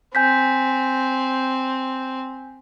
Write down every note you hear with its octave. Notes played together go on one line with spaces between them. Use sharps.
C4 G#5 G6 B6